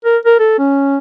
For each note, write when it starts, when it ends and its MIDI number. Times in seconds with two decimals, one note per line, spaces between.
0.05 0.17 70
0.25 0.35 70
0.39 0.57 69
0.59 0.98 61